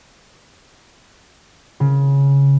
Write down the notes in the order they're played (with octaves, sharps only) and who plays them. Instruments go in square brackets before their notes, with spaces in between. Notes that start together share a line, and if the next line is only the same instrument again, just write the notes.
[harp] C#3